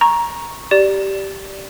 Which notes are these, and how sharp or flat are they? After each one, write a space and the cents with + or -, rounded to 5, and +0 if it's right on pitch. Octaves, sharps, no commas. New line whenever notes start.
A#5 +15 C#6 -10
G4 -10 D5 +0